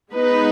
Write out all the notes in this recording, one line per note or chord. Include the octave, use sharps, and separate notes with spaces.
G#3 B3 D#4 B4